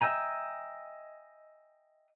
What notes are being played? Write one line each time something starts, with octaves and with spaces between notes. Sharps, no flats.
D#5 E5 G5 G#5 A#5